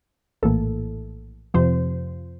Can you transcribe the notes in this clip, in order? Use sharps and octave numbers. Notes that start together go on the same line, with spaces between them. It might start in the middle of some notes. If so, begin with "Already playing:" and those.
A#1 A2 E3 A#3 A4
F2 C3 F3 C4 C5